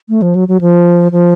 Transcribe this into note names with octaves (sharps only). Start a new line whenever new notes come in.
A3
F3
F#3
F#3
F3
F3